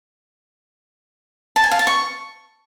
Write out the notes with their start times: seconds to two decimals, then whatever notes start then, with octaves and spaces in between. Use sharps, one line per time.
1.56 A5
1.64 G#5
1.71 F5
1.79 A5
1.87 C#6